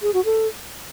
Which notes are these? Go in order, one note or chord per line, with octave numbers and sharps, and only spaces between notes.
G#4
F#4
A4